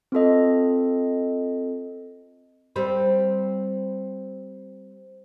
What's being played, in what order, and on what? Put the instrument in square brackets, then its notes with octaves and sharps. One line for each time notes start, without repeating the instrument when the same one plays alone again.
[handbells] C4 F4 A4 D#5
[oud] G3 C4 B4